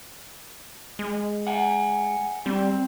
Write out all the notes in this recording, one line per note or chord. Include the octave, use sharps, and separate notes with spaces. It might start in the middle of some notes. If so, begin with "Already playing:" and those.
G#3
F#5 G#5
G3 C4